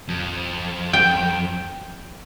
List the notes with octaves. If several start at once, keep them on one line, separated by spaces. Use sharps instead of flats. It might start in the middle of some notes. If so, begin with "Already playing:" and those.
F2
G5